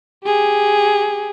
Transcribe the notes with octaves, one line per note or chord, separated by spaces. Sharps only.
G4 G#4